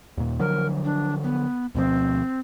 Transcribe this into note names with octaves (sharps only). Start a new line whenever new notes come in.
D#2 A#2
D3 F3 F#3 A#4
D4
B3
D2 B2 F3 C4